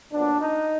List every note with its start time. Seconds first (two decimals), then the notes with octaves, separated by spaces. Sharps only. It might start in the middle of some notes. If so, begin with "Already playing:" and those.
0.12 A#2 F#3 B3 D4
0.40 D#4